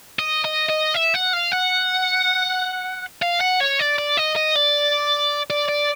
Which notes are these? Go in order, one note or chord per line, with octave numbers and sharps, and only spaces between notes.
D#5
D#5
D#5
E5
F#5
F5
F#5
F5
F#5
C#5
D5
D5
D#5
D#5
D5
D5
D5